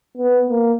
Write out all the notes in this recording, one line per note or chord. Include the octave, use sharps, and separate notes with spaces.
B3
A#3